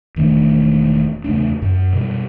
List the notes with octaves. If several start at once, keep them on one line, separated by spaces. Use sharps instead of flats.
E1 D#3 A3 D4
E2 C#3 A3 D4
F#2
B2 G3